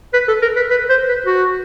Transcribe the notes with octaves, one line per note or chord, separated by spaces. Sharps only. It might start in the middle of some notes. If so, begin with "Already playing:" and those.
B4
A4
A#4
B4
B4
C5
B4
F#4